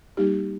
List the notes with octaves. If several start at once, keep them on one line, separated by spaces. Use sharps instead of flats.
G3 A#3 D#4 G4